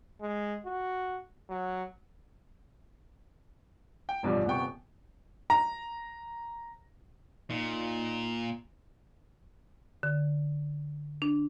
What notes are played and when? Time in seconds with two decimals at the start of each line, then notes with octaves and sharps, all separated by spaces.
0.21 G#3
0.65 F#4
1.49 F#3
4.09 G5
4.23 A1 G2 B2 F3 G3
4.46 D#1 C3 B3 G5 C#6
5.50 A#5
7.50 A#2 D#4
10.03 D3
11.22 D4